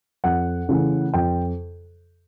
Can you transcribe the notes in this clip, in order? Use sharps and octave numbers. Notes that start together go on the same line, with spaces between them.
F2 F#5
C#3 E3 A3
F2 G5